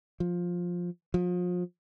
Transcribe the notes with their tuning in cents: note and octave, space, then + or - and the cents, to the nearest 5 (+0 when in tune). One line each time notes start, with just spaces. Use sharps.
F3 +10
F3 +35